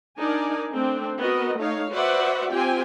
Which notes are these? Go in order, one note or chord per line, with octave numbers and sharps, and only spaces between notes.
D4 D#4 A#4 D5 G#5
A3 C4 D4
B3 F#4 A#4 D#5
A3 D#4 C#5 F5
F#4 B4 C5 D5 E5 F#5
C4 F4 G4 G5 G#5